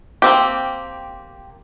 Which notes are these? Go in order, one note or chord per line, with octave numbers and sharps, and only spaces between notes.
A#3 C4 G4